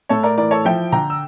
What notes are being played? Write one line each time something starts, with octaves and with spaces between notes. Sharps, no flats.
A2 A4 C#5
A#4 D5
E3 A#4 D5
A4 C#5
F3 E5 G5
D3 G5 A#5
E6